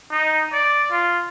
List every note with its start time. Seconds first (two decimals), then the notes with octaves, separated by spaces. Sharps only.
0.11 D#4
0.53 D5
0.91 F4